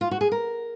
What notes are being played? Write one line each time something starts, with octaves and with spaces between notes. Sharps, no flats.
F4
F#4
G#4
A#4